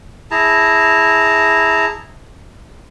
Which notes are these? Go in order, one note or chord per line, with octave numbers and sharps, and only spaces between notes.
E4 G#4 A5 A#5